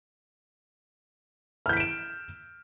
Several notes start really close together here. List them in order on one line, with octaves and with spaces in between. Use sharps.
F6 G6 B6 D7 E7